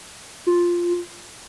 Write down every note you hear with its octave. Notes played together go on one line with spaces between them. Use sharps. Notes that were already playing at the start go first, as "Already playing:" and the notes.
F4